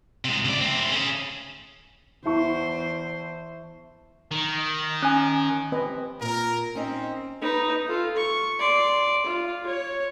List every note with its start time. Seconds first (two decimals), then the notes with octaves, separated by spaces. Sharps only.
0.25 C3 G#3
0.45 C#2 D5
0.61 A3 C4
0.92 C#4 G#4
2.25 E2 E4 C5 A5 C#6
4.31 D#3
5.02 C#4 G#5
5.72 C4 B4 D#5
6.21 A#2 A#4
6.75 C4 C#4 D#4 D#5
7.41 D#4 B4
7.88 F4 A4
8.17 C#6
8.59 D5 C6
9.26 F4
9.67 C#5